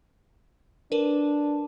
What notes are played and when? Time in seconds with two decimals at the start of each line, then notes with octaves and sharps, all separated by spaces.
0.92 D4 A#4 B4